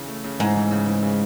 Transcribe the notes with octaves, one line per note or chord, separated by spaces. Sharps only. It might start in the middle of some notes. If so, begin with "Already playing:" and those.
Already playing: C#3 E3
A3
C#3
G#2 E3
E3
C#3
E3
C#3